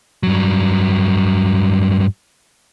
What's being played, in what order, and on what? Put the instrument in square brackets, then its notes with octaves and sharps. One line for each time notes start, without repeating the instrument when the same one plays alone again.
[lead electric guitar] G2 F#3